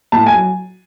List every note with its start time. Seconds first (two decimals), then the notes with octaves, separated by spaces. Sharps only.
0.12 A2 A5
0.26 G#5
0.34 F#3